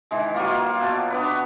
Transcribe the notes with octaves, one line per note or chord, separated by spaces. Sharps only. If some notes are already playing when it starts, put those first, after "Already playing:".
D#3 E3 G#3
F#3 G3 A#3 F4
B2 F#4 A5 D6
B3 D4 B4
C#6